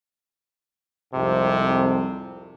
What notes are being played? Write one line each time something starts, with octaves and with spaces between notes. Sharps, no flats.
C2 F2 G#2 C3